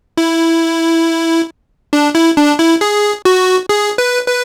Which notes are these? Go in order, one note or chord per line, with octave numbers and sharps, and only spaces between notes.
E4
D4
E4
D4
E4
G#4
F#4
G#4
B4
B4